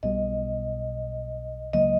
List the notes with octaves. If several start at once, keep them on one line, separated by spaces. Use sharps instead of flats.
B1 B2 G3 D#5
C#2 C#3 F#3 A#3 D#5